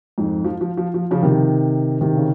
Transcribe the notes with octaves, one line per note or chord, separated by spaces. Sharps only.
F2 G#2
F3
F3
F3
F3
C#3 F3
C3 D#3
C3 D#3
C#3